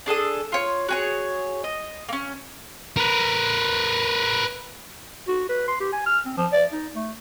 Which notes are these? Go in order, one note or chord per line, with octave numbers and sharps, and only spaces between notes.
D4 G#4 A4 D#6
F4 C#5
F#4 G#4 C#5
D#5
A#3 C#4
A#4 B4
F#4
B4
C6
G4
G#5
F6
C4
F3
D5
D#4
A3